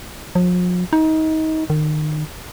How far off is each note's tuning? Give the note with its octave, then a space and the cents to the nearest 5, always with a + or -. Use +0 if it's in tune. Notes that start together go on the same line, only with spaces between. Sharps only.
F3 +45
D#4 +25
D#3 -30